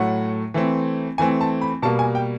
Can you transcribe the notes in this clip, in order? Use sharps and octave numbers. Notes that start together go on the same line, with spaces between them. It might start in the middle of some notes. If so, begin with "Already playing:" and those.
Already playing: A2 F#3 A3 F#5
E3 A3 C4
E3 A3 C4 G#5
A5
B5
B2 G3 A#3 A5
G#5
G5